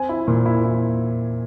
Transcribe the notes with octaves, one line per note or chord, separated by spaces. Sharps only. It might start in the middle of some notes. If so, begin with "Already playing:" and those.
Already playing: C4 G#5
E4
A#2
E4
E4